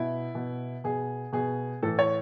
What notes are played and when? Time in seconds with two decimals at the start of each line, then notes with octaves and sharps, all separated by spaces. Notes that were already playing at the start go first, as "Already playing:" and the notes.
Already playing: B2 E4
0.35 B2
0.84 B2 G#4
1.33 B2 G#4
1.82 A2 E3 A4
1.99 C#5